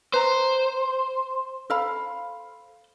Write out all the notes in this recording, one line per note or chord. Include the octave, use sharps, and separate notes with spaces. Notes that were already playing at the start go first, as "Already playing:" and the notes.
B4 C5 A#5
A4 F5 B5